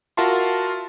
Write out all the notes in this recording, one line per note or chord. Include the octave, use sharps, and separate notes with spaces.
F4 F#4 A#4 E5 A5 C6